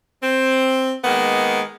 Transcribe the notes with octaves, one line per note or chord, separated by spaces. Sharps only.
C4
D#3 G#3 A#3 B3